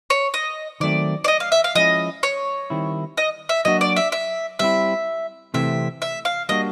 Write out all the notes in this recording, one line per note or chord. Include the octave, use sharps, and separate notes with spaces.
C#5
D#5
D#3 F#3 A3 C4 D5
D5
D#5
F5
E5
F5
F3 G#3 C#4 E4 D#5
C#5
D#3 G3 C4 E4
D#5
E5
F#3 A#3 D4 F#4 D#5
D5
E5
E5
G3 C4 E4 E5
C3 E3 A3 C4 E5
E5
F5
G3 A#3 D4 F#4 D#5